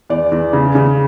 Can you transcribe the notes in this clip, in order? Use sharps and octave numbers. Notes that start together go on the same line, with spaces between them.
E2 D5
E2
C#3
C#3